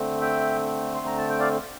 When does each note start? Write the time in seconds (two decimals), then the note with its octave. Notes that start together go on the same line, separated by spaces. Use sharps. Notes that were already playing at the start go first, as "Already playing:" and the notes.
Already playing: D3 A3 C4
0.21 E5 G5
0.95 C6
1.06 A#5
1.17 A5
1.29 G5
1.40 D5 F5